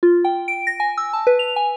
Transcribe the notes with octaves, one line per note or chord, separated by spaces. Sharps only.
F4
G5
D7
A#6
G#5
E6
A5
B4
F7
G#5